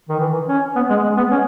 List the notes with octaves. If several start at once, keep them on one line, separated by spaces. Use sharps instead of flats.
D#3
E3
C#4
B3
G#3
G#3
B3
C#4